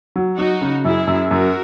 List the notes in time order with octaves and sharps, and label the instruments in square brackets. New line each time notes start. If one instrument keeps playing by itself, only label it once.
[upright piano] F#3
[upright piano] F#3 [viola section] D#4 F#4
[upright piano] C#3
[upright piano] F#2 [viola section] E4 G#4
[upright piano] F#2
[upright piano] F#2 [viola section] F#4 A#4